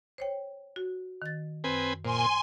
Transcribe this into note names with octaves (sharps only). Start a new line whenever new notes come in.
C5 C#5 G5
F#4
D#3 A6
F#2 C4 B4 G#5
A#2 C5 G#5 C6